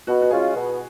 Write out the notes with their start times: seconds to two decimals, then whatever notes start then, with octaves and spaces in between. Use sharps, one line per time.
0.07 B2 F#4
0.22 F#4
0.31 G#3 C#4 F4 G#4
0.54 B2